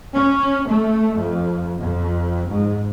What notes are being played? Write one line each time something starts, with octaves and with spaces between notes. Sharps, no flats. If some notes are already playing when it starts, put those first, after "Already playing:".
C#4
A3
F2
F2
G#2